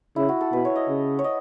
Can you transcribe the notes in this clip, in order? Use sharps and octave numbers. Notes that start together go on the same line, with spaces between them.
C#3 E4
F#4
A4
B2 B4
C#5
D#5
C#3
C#5
D#5